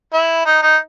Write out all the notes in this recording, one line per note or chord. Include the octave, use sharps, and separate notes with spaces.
E4
D#4
D#4